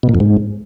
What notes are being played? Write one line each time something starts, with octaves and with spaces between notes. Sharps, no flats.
B2
A#2
F2
G#2